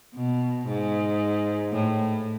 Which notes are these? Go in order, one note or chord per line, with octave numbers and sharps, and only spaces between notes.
B2
G#2
A2